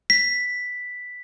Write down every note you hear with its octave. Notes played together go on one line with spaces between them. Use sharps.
B6